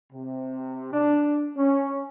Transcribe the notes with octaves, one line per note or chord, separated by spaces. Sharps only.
C3
D4
C#4